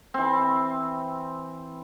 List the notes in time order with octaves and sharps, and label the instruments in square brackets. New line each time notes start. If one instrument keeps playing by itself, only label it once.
[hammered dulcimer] E3 C4